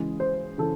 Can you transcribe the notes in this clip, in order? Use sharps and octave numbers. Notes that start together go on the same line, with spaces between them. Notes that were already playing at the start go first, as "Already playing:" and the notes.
Already playing: C#3 E3 G#3 G#4
C5
C#3 E3 A4